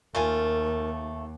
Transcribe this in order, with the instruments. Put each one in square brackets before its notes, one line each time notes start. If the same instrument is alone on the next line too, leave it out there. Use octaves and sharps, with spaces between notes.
[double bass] D#2 [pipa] A3 F4 G#5 [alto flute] A#4